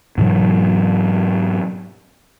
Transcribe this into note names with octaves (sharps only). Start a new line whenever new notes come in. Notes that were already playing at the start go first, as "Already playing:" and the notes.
G#2 B2 E3 F#3